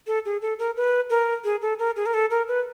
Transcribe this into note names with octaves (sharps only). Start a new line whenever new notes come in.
A4
G#4
A4
A#4
B4
A#4
G#4
A4
A#4
G#4
A#4
A4
A#4
B4